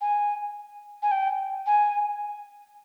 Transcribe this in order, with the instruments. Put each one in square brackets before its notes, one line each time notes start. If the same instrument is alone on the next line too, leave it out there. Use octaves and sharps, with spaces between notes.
[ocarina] G#5
G#5
G5
G#5